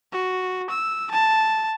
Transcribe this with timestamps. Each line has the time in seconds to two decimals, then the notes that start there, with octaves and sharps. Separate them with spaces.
0.12 F#4
0.70 E6
1.11 A5